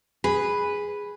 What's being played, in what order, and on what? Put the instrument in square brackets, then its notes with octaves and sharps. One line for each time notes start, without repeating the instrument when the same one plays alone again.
[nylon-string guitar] G#4 [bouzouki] B4